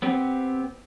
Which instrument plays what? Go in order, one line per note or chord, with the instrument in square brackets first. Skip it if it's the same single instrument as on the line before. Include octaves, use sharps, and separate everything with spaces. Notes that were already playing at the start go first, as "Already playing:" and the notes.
[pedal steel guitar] B3 C4 G4